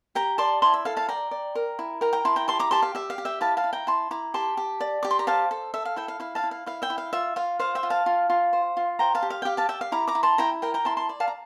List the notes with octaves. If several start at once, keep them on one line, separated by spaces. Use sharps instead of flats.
G4 G5 A#5
D5 A5 C6
E4 A5 C6
E5
A4 F5
F5 A5
D5 G5 A#5
D5
A#4
E4
A#4 G5 A#5
G5 A#5
E4 A5 C6
G5 A#5
G4 A5 C6
A#5 D6
G4 A5 C6
F5
G4 E5
F5
G4
E5 G5
E4 F5 A5
F5 A5
E4
G5 A#5
E4 A5 C6
E4 A#5 D6
G4 A5 C6
G4
D5
G4 D6
C6
A#5
C5 F5 A5
A4
A4 E5
F5
E4 E5 G5
F5
E4 F5
F5 A5
E4
F5
E4 F5
E5 G5
E4
F5
F4 E5
F4 F5
C5 F5
E5 G5
F4
F5 A5
F4
F4
C5
F4
C5 G5 A#5
F5 A5
G4
F5
G5
G4 F5
F5 A5
G4 E5 G5
F5
E4 A#5 D6
A#5 D6
E4
A5 C6
E4 G5 A#5
A#4 G5 A#5
G5 A#5
E4 A5 C6
A5 C6
D5
F5 A5
A#5